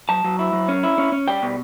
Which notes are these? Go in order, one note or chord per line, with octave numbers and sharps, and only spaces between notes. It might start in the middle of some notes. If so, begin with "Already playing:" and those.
F#3 A5
F#3
E4
F#3
C#4
E4
C#4
C#4
G3 G5
B2